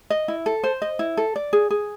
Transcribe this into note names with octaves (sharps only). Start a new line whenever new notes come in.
D#5
E4
A4
C5
D#5
E4
A4
D5
G#4
G#4